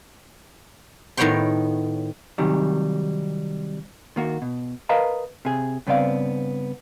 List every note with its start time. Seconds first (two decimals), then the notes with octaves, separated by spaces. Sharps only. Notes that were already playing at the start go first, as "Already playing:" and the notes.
1.17 A2 D#3 B3 C#5 G5 C6
2.38 C3 D#3 F#3 G3
4.16 D#3 A#3 F#4
4.42 B2
4.89 A#4 B4 D#5 F5 A5 A#5
5.45 C3 G#4
5.87 G2 C#3 B3 C4 D5 F5